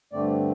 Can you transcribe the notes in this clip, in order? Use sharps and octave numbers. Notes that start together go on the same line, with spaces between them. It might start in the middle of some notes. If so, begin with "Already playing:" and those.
G2 D3 A3 C4 D5